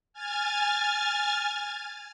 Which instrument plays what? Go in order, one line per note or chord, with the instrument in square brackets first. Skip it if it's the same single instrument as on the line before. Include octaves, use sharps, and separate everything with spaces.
[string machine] G#5 F6 G#6 A6